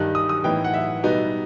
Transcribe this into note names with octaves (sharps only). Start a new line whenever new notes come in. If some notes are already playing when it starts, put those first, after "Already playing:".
Already playing: G2 D#3 G3 D#4 F#6
D#6
D#6
A2 E3 B3 D#4 G5
F#5
E5
B2 G3 B3 D#4